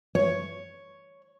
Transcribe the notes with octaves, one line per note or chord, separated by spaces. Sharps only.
C#5